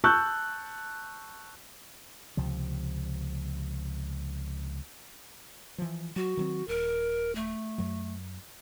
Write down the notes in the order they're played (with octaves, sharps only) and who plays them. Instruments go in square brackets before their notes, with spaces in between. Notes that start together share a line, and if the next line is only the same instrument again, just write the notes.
[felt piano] A5 C#6 E6 F#6 G6
[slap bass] C#2 C3 F3
[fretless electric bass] E3 F3
[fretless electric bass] F#3 [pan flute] F#4
[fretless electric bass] D#3 F#3 C4
[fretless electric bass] D#1 [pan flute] A#4
[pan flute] A3
[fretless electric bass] F#2 F#3